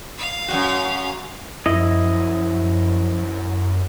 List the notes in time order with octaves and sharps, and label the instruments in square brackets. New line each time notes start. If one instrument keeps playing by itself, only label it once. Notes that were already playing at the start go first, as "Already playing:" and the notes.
[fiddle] F5
[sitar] F#2 A#2 F#4
[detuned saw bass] F#2 [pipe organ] F3 [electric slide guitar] E4 D#5